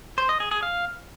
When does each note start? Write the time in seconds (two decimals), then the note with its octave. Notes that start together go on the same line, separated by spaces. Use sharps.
0.18 C5
0.29 D#5
0.40 G#4
0.51 G#4
0.63 F5